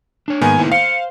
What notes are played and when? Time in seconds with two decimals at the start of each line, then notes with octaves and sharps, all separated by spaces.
0.28 D4 C#5
0.41 G#2 D#3 A#3 B3 G#5
0.58 A2 E4 C5
0.72 C5 F5 C#7